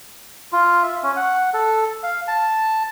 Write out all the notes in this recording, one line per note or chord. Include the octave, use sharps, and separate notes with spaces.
F4
E5
C#4
F#5
A4
F5
A5